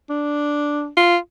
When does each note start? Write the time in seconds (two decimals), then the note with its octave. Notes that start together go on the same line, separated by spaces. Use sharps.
0.10 D4
0.97 F4